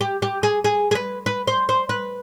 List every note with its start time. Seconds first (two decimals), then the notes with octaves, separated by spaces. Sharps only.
0.01 G4
0.22 G4
0.43 G#4
0.64 G#4
0.91 G#4
0.95 B4
1.26 B4
1.47 C5
1.69 C5
1.89 B4